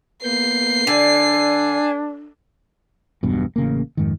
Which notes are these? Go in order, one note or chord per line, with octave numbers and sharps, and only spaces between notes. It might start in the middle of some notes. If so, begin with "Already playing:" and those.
A#3 B3 G6 C7
D3 D4 G#5
E1 B1 G2 B2
A1 C#3 A#3
F2 G#2 D#3